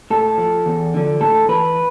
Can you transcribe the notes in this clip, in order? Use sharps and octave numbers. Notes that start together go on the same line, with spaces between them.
A2 A4
F3
E2
D3 F3
A2 A4
E3 B4